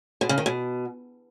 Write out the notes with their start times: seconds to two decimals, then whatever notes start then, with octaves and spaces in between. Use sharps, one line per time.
0.21 B2
0.29 C#3
0.38 D#3
0.46 B2